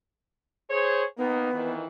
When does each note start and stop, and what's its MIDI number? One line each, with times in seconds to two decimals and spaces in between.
0.69 1.02 68
0.69 1.02 72
0.69 1.02 73
1.18 1.50 51
1.18 1.50 58
1.18 1.75 59
1.18 1.50 63
1.52 1.86 41
1.52 1.86 51
1.52 1.86 52